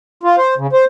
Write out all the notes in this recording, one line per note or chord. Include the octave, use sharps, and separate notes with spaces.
F4
C5
C#3
C5